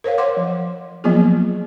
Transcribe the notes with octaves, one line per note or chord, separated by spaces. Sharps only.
A#4 C5 C#5 F5
A#4 C#5 F#5 C6 D6
F3
F3 F#3 A#3 B3 F4 G#4